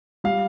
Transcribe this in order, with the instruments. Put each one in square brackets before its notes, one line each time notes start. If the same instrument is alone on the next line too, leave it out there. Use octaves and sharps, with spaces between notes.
[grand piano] G3 F5